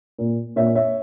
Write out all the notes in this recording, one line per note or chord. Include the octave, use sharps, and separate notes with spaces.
A#2
A#2 C#5 E5
C#5 E5